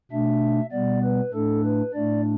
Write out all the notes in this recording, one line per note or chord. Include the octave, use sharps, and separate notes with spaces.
B2 A3 D4 E5
B2 G3 B3 D5
B4
A2 A3 D4 A4
B4
A2 A3 D4 D5